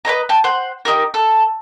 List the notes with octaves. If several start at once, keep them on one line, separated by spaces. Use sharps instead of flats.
B4 C#5 D#5 A#5
G5 A5
C5 F#5
D#4 G4 A#4
A4